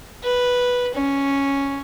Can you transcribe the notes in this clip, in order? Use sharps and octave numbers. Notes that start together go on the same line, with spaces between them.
B4
C#4